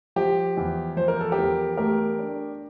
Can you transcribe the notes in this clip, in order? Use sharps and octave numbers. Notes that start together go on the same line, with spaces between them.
F3 G4
E2
F3 C5
A#4
A4
G4 A#4
E2
A3 G4 A#4
D4